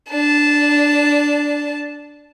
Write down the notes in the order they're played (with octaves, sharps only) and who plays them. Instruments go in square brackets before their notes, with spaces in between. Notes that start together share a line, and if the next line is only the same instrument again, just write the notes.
[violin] D4 A5